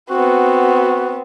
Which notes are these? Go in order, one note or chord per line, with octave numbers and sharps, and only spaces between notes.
B3 C4 F#4